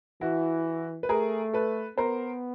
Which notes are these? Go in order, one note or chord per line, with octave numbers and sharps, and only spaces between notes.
E3 E4 F#4
B4
A3 G#4 A#4
A4 B4
B3 A#4 C5